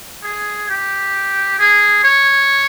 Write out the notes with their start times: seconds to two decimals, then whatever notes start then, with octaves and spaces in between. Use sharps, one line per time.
0.23 G#4
0.69 G4
1.59 G#4
2.04 C#5